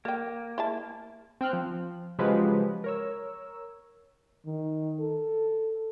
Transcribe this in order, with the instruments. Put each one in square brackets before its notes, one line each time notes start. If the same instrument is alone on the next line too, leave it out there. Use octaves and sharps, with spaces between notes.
[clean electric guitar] A#3 [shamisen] A4 G5
[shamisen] E4 G#4 A5
[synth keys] C4 G5 F6 F#6
F3
C#3 F3 F#3 G#3 G4 B4
A#4 C#5 E6
[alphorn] D#3
A4